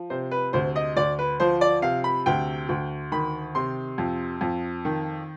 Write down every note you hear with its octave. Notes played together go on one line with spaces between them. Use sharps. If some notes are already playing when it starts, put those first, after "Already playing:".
Already playing: F3
C3 C5
B4
D2 C5
D#5
D2 D5
B4
F3 C5
D5
C3 F5
B5
D2 G5
D2
D#3 B5
C3 C6
F2
F2
D#3